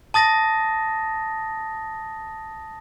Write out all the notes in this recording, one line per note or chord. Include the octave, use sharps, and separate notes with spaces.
A5 D#6 A6 A#6